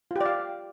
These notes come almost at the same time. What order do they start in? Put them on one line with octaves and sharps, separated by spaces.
F4 G4 D5 F5